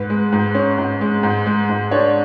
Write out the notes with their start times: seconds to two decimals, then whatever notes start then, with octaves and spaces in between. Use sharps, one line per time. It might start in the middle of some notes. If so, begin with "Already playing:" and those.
Already playing: G#2 B4
0.10 G#3
0.32 G#2
0.55 C#4
0.78 G#2
1.01 G#3
1.23 G#2
1.46 G#3
1.69 G#2
1.91 D4 C#5